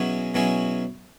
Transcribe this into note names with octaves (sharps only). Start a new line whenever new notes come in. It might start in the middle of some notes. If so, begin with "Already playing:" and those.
Already playing: B2 F#3 C#4 E4 G#4
B2 F#3 C#4 E4 G#4